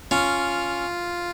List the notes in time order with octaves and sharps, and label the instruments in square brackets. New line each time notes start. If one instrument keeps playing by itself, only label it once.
[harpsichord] C#4 [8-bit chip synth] F4